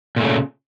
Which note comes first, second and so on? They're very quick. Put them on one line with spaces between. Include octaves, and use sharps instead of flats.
A#2 A3 C#3